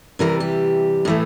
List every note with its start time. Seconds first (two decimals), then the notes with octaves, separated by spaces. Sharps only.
0.19 C3 E3 G3 A#4
0.40 G4
1.05 A2 E3 A3